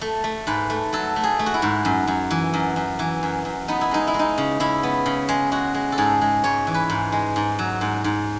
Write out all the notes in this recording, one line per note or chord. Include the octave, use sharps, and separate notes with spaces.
A3
A3
G#2 B4
A3
F#3 A4
A3
G#4
A3
F#4
E4
G#2
F#2
F#2
E3
F#2
F#2
E3
F#2
F#2
B3 D#4
E4
G#3 D#4
E4
G#3
D#4
C#3
C#3 E4
B3
C#3
G#3
G#3 F#4
G#3
A4
G#2 G#4
G#3
G#2 C#5
E3
B4
G#2
G#3
G#2
F#3
G#2
G#2